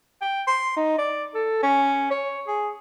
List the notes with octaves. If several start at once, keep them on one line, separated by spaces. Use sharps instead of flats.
G5
C6
D#4
D5
A4
C#4
C#5
G#4